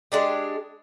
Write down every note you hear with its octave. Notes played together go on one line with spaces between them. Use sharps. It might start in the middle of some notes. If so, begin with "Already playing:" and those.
G#3 D4 G4